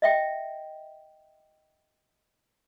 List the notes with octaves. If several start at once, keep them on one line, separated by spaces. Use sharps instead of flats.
D#5 E5 G5